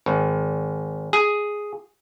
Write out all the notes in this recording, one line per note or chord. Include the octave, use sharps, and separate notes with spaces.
G#1
G#4